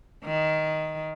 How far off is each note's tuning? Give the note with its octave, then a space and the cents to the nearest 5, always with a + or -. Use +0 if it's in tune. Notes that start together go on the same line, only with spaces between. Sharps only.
D#3 +5